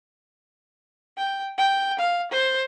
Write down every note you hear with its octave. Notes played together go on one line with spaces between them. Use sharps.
G5
G5
F5
C5